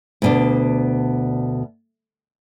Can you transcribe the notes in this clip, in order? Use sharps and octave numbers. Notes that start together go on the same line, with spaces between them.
D2 B2 D4